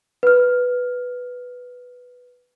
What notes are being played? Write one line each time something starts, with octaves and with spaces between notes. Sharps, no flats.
B4 F6